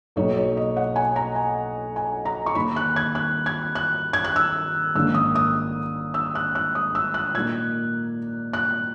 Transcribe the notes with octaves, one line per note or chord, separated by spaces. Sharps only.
B1 B2 A#3 D#4 C#5
C#5
D#5
F#5
G#5
A#5
G#5
G#5
A#5
C#6
D#2 D#3 A#3 B5
F#6
G#6
F#6
G#6
F#6
G#6
F#6
E6
A#1 G#2 D#3 A#3 C#4 E6
D#6
D#6
E6
F#6
F#6
D#6
E6
F#6
A#2 A#3 D#4 G#6
F#6